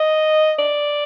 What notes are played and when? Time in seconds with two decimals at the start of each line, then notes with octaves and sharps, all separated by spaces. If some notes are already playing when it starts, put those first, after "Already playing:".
Already playing: D#5
0.59 D5